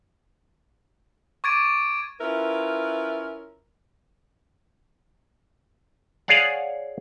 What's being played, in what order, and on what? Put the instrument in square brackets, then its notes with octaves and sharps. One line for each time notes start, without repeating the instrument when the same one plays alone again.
[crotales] C#6 D6 G#6 A6 D7 D#7
[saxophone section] C#4 E4 F4 A#4 B4
[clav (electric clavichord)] G#4 C#5 D5 F5 F#5